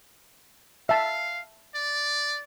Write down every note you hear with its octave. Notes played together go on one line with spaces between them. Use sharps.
E5 F5 A5
D5